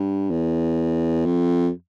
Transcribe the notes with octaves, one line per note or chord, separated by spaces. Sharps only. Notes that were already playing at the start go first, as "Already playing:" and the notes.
Already playing: G2
E2
F2